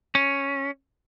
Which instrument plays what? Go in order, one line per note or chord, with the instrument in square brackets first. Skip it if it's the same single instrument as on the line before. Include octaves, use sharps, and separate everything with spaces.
[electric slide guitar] C#4